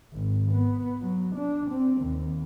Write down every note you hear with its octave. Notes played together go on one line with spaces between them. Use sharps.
G#1
B3
F#3
D4
C4
D#2